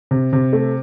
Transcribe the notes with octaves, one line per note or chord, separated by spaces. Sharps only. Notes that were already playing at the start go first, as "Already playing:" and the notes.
C3
C3
A3